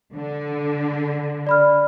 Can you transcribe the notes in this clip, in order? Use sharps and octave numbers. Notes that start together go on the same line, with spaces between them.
D3
D5 B5 F6